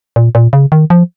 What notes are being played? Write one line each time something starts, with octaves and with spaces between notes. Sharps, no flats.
A#2
A#2
C#3
D#3
F3